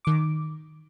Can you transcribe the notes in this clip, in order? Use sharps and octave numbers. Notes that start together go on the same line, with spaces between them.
D#3 D6